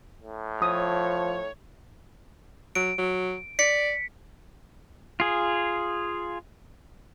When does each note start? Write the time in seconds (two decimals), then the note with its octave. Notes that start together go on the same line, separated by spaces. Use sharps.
0.21 A2
0.62 F3 C#5 D#6
2.75 F#3 D7
2.98 F#3
3.59 D5 B6 C#7
5.20 F4 G#4